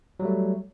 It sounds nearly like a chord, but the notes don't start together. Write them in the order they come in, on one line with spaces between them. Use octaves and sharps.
F#3 G3 A3